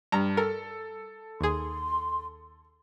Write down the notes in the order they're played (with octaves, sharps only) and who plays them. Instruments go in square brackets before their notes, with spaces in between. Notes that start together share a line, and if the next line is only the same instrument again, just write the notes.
[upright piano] G2 [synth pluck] A#5
[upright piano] A4 [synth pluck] A#4
[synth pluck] D#2 G#4 [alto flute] C6